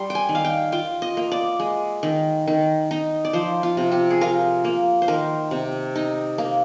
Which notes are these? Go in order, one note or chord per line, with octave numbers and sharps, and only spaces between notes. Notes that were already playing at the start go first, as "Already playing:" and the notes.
Already playing: G3 A#5 C6
G5
G#5
D#3
F5
G5
F4 G5
D#5
A#3
D5
G#3
D#3
D#3
D#4
D5
F3 C5
F4
C3
G4
G#4
F4 A#4
A#3
C5
D#3 A#4
C3
D#4
A#3